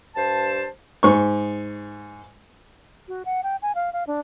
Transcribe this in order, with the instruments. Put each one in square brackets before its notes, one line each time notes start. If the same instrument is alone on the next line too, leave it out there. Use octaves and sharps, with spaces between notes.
[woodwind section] G2 C5 A5
[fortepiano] G#2 C#6
[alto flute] F#4
F#5
G5
G#5
F5
F5
D4